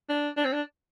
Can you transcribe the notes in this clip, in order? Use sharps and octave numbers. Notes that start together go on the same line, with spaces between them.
D4
D4
C4
D4